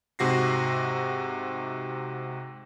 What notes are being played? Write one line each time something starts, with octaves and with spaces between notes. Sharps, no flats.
G#2 C3 F#4 A#6 C7